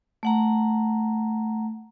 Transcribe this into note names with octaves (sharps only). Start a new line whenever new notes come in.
A3 F#5 A#5